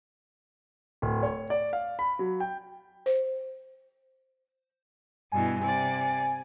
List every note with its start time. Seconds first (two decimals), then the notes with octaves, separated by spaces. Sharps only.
1.02 D1
1.23 C#5
1.50 D5
1.73 F5
1.99 B5
2.19 F#3
2.40 G5
3.06 C5
5.32 G2 B2 E3 G#5
5.61 C3 D5